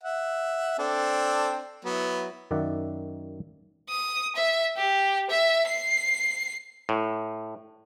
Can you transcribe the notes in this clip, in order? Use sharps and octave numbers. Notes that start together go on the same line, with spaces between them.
E5 F#5
C4 D4 A4
F#3 B3 E4
F#2 D#3 D5 E5 F#5
D#6
E5
G4
E5
C7
A2